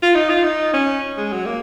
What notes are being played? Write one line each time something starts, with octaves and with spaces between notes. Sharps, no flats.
F4
D#4
F4
D#4
C#4
G#3
F#3
A#3